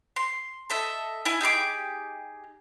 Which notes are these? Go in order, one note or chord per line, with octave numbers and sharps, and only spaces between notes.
C6
A4 D#5 E5
E4 G#5
D#4 G4 G#4 D6